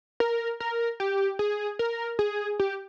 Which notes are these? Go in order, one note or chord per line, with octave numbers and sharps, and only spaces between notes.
A#4
A#4
G4
G#4
A#4
G#4
G4